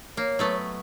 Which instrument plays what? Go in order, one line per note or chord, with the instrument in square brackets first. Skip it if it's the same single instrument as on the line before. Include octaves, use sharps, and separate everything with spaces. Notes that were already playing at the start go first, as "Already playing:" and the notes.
[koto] A#3 [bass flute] C#5
[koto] F#3 A3 B3